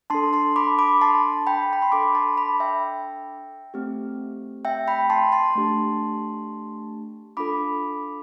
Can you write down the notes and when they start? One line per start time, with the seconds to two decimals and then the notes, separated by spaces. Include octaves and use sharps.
0.10 D4 A4 A5 C6
0.33 A5 C6
0.56 B5 D6
0.79 B5 D6
1.01 A5 C6
1.47 G5 B5
1.63 A5
1.73 B5
1.82 C6
1.92 D4 A4 B5 D6
2.15 A5 C6
2.37 B5 D6
2.60 E5 G5
3.74 A3 C4 G4
4.65 E5 G5
4.88 G5 B5
5.10 A5 C6
5.32 A5 C6
5.55 A3 D4 G4
7.37 D4 F4 A4 B5 D6